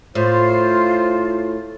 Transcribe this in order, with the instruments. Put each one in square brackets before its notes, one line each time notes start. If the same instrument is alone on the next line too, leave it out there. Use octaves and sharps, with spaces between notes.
[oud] A2 [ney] F4 [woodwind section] C5